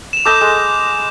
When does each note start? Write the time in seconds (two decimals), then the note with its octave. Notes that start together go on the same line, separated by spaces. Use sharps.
0.13 E7 F7
0.25 A4 D#5 B5 D6 G6 E7
0.41 G#3